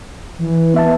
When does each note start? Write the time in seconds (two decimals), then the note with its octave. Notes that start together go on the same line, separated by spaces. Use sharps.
0.39 E3
0.74 B3 E5 A5